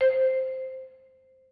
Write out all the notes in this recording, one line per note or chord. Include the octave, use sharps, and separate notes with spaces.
C5